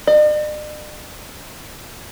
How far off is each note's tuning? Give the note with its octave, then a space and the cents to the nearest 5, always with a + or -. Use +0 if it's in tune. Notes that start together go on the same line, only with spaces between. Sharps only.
D5 +45